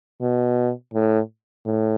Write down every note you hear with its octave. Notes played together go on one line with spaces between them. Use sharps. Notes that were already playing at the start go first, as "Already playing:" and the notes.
B2
A2
A2